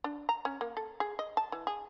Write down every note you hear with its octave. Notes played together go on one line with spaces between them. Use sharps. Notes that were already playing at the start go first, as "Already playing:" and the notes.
D4
A#5
C#4
A#3
A4
G#4
D#5
A5
E3
G#4